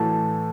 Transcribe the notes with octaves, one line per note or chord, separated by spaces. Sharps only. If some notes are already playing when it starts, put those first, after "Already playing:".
Already playing: A2 E3 A3 F#4 A4 A5